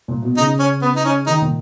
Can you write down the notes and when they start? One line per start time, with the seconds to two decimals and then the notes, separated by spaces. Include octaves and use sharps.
0.08 A#2
0.22 B2
0.37 C#3 D#4
0.59 C#4
0.82 B3
0.96 D#4
1.05 C#4
1.27 D#3 D#4
1.42 A#2